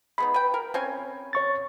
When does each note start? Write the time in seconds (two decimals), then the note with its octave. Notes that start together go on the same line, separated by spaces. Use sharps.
0.18 G#3 B3 D#4 B5
0.34 B4 G5
0.54 A#4
0.74 C4 C#4 G#5
1.33 C#5 C#6 A6